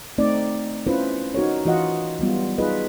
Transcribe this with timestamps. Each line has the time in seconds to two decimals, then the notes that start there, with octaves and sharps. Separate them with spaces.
0.18 A3 C4 D#4 D5
0.87 C#4 E4 F4 B4 C5
1.35 D#4 F#4 A#4 C#5
1.65 E3 F4 F#4 D#5 F#5
2.19 F#3 G3 B3 F4
2.58 D#4 F4 G#4 B4 D#5